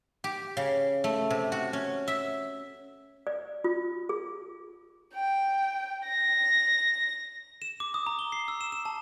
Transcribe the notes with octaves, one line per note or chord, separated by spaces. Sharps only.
G4
C#3
A3
C3
F#4
C#4
E5
D5
F4
G#4
G5
A#6
E7
D6
D#6
A#5
G7
C7
E6
E7
E7
A5